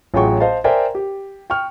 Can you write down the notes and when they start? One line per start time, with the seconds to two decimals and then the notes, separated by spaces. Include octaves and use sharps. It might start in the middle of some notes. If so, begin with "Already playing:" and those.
0.14 A1 F#3 F4 G#4 G5 C#6
0.40 C5 D#5 F5 A5
0.64 A#4 C5 D5 E5 G5 G#5
0.95 G4
1.50 G5 C#6 F6